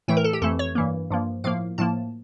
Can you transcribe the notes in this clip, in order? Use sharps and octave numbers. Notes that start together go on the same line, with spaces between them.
A2 E3 A3 G5
A#4
A4
G4
F2 E3 A3 A4
C#5
G2 E3 A#3
G2 F3 A#3
A2 F3 A#3 F5
A2 F3 A#3 A5